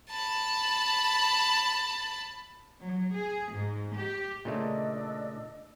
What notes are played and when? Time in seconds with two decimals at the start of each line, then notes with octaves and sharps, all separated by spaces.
0.10 A5 B5
2.81 F#3
3.15 G#4
3.54 G#2
3.98 G4
4.45 A#2 C#3 A3 D4 D#5 E6